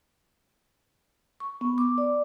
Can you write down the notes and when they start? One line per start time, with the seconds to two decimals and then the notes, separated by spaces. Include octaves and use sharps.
1.40 C#6
1.61 B3
1.78 D6
1.98 D5